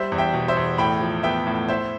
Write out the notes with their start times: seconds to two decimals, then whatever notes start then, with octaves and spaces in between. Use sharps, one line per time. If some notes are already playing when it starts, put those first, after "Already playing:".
Already playing: G3 C5 E5
0.12 E2
0.18 E5 G5
0.34 B2
0.48 C5 E5
0.57 E2
0.78 A2 G5 B5
1.01 F3
1.23 B3 E5 G5
1.47 A2
1.68 E4 C5 E5